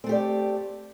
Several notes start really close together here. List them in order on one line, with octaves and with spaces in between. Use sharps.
C4 A3 G4 D5